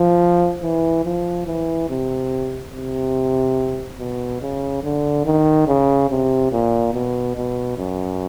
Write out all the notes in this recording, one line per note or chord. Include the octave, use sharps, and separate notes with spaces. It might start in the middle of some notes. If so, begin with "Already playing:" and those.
Already playing: F3
E3
F3
E3
C3
C3
B2
C#3
D3
D#3
C#3
C3
A#2
B2
B2
F#2